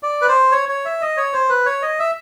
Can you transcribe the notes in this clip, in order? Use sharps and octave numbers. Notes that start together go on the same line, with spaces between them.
D5
B4
C5
C#5
C#5
E5
D#5
C#5
C5
B4
C#5
D#5
E5